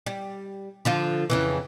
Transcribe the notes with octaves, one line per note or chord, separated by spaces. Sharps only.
G3
D3 F3 F4
F2 C#3 E3